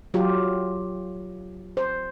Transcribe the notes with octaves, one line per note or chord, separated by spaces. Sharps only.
F#3 F4 G4
C5